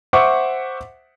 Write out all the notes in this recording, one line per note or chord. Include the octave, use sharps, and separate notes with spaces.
C5 E5 F#5 C#6 D6